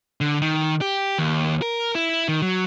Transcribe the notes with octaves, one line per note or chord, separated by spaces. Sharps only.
D3
D#3
G4
D#2
A#4
E4
D#3
F#3